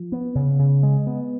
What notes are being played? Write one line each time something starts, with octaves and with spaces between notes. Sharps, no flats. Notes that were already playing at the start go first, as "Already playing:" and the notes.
Already playing: F3
B3
C#3
C#3
G#3
B3